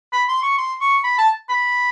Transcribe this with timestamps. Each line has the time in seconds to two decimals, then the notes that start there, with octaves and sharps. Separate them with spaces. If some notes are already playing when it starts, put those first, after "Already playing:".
0.13 B5
0.29 C6
0.43 C#6
0.58 C6
0.81 C#6
1.04 B5
1.18 A5
1.49 B5